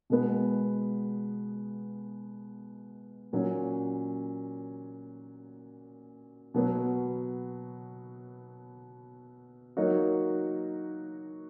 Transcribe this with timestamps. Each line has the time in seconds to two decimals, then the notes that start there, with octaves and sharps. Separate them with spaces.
0.10 B2 G#3 B3
3.33 A#2 F#3 C#4
6.54 B2 F#3 B3
9.77 F#3 A#3 D#4 F#4 C#5